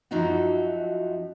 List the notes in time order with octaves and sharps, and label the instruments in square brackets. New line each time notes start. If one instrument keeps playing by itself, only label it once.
[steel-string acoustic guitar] F#2 F3 F#3 D#4 E4 F#4